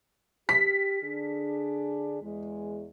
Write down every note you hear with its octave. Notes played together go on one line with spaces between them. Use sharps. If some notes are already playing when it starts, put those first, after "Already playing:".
G4 B6
D3 D4 G#4
E2 G#3